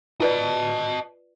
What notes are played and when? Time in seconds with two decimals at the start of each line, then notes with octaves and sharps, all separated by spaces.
0.20 F4 B4 D5 D#5 A5